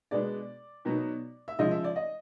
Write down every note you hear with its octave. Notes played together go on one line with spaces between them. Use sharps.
B2 G#3 B3 D4 D5
B2 F#3 B3 D#4
E5
C#3 F3 G#3 D#5
E5
D5
D#5